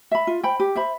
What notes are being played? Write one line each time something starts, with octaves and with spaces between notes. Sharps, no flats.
E5 B5
F4
C5 G5 B5
G4
C5 E5 B5